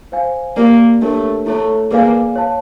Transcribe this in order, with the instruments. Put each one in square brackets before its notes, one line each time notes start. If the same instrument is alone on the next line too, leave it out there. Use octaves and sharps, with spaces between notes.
[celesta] C5 F5 G#5
[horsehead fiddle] A#3 [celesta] G4 A#4 D5
[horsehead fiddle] A3 [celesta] D4 G4 A#4 C#5
[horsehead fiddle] A3 [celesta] E4 A4 C#5
[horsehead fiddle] A#3 [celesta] G#4 B4 D5 F5 G#5
[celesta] C#5 F5 A5